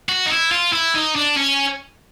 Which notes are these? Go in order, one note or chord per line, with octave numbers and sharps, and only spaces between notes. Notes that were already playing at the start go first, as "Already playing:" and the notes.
F#4
D#4
E4
F4
E4
D#4
D4
C#4